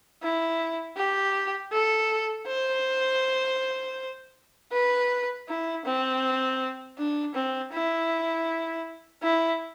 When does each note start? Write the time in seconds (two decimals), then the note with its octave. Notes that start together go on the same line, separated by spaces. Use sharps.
0.23 E4
0.97 G4
1.72 A4
2.48 C5
4.72 B4
5.48 E4
5.85 C4
6.98 D4
7.35 C4
7.73 E4
9.23 E4